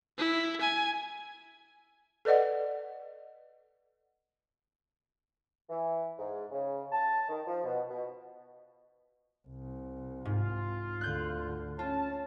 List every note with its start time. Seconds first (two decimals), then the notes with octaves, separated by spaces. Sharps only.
0.18 E4
0.61 G#5
2.25 A4 B4 D5 D#5 F#5
5.70 E3
6.19 G#2
6.52 C#3
6.92 A5
7.29 D#3
7.47 F3
7.64 B2
7.90 B2
9.48 C2
10.25 G#2 F4
11.01 D2 D3 F#6 G6
11.79 C#4 F4 A5